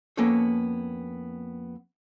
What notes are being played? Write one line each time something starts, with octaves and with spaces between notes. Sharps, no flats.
F2 A#3 B3 C#4 A4 C#5